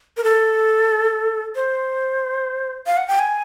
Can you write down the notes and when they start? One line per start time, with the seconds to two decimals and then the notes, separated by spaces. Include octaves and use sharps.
0.17 A#4
0.24 A4
1.56 C5
2.87 F5
2.97 F#5
3.08 G5
3.19 G#5